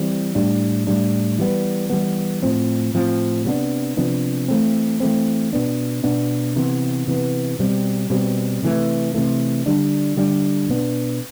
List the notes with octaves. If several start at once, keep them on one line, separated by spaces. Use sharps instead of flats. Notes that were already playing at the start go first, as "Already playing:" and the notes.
Already playing: E3 G3 C4
A2 G3 D4
A2 G3 D4
E3 G3 B3
E3 G3 B3
A2 F3 C4
A2 F3 C4
C3 F3 B3 D4
C3 F3 B3 D4
E3 A3 C4
E3 A3 C4
B2 B3 D4
B2 B3 D4
C3 E3 B3
C3 E3 B3
B2 G3 C4
B2 G3 C4
C3 E3 A3
C3 E3 A3
D3 G3 D4
D3 G3 D4
B2 B3 D4